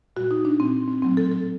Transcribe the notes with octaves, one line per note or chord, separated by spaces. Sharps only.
A#2 G3 F#4
D#4
D4
A#2 G3 C4
C4
A2 F#3 A3 C4
A4
A4